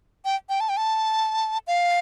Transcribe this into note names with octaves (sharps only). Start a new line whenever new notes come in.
G5
G5
A5
G5
A5
F5